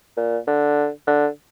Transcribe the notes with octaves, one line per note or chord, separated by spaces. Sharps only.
A#2
D3
D3